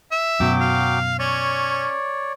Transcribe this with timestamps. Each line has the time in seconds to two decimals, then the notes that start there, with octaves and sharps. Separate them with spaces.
0.12 E5
0.40 F#2 B2 F#3 G5 D6
0.61 F5
1.19 C#4 C#5 D5